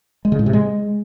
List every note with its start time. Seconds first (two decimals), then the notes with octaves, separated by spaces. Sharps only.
0.25 G#3
0.32 C#3
0.39 A2
0.46 C3
0.53 G#3